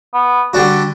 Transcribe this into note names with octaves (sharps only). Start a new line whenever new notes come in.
B3
D3 G3 D4 F#4